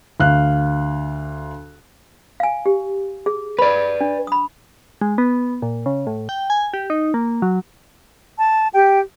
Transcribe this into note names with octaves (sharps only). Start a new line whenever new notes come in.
D2 F5 F#6
F5 G#5
G4
G#4
B4 D5 B5
D4
B5 D#6
G#3
B3
A#2
C#3
A2
G5
G#5
G4
D#4
A#3
F#3
A5
G4 G5